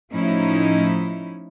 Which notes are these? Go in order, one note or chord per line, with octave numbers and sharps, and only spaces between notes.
A2 F3 C#4 D#4 E4